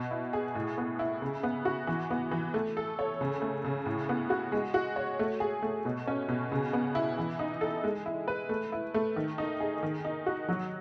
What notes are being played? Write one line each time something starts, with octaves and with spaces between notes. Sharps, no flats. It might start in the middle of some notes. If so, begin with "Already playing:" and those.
Already playing: B2
E4
G#4
A2
B3
E4
C#3
B3
F#4
E3
B3
E3
A3
A4
C#5
C#3
A3
C#3
A2
B3
F#4
G#3
F#4
C#5
A3
G#4
A3
B2
C#4
B2
C#3
B3
E4
E3
D#4
A4
G#3
E4
B4
A3
E4
A3
D#3
D#4
G#4
D#3
D#4
F#4
F#3